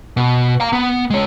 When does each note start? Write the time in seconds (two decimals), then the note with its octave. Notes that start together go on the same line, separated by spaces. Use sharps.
0.17 B2
0.60 F5 A#5
0.73 B3
1.10 G#3 C#5